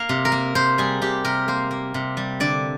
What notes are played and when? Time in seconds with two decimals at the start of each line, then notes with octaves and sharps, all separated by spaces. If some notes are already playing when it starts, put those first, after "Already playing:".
Already playing: A#3 F5
0.09 C3
0.25 A#4
0.32 A#3
0.55 C3 C5
0.78 G3 G#4
1.01 C3 G4
1.25 C3 A#4
1.48 A#3 C5
1.71 A#3
1.94 C3
2.17 G3
2.40 D3 D5